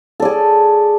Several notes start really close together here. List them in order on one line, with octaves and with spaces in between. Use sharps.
A4 D5 G#4